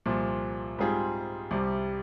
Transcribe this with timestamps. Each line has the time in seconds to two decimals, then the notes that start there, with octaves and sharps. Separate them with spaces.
0.06 C2 A#2 F3
0.79 G#2 G3 C4 F4 G#4
1.51 C2 C3 G3